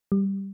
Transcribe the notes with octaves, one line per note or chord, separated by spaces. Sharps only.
G3